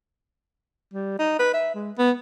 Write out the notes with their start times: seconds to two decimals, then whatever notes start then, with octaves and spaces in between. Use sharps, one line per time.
0.93 G3
1.19 D#4
1.39 B4
1.54 E5
1.75 G#3
1.98 B3